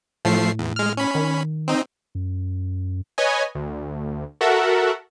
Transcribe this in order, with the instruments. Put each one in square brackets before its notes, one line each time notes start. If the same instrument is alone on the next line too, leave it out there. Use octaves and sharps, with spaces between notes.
[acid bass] A2 [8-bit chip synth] F3 A3 C7
[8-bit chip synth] E2
G#3 F6
C#4 B5
[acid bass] D#3
[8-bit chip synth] C4 D#4
[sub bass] F#2
[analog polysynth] B4 C#5 D#5 G#5
D2
F#4 A4 A#4 E5 F#5